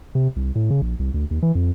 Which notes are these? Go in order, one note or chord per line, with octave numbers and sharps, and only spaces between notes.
C3
C2
A2
C#3
A#1
C2
D2
D#2
E3
F2